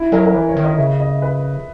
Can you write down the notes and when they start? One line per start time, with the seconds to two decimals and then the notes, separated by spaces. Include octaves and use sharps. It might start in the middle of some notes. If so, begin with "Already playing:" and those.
Already playing: E4
0.12 F#3 A#4
0.26 A#4
0.34 E3 B4
0.49 C#5
0.57 D#3
0.64 D#5
0.78 C#3 E5
1.00 D#5
1.22 B4